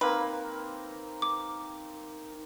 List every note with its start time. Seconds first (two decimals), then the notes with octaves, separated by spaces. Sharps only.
0.01 A#3 C4 D#4 B4
1.22 D6